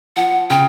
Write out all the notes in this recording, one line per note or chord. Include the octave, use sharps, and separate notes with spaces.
F3 F#5
C#3 G5